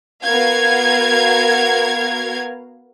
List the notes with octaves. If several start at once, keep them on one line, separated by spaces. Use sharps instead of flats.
B3 F#4 A#4 F5 G#6